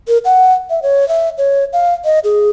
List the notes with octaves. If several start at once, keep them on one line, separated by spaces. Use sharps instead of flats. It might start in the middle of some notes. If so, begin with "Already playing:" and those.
A#4
F#5
E5
C#5
E5
C#5
F5
D#5
G#4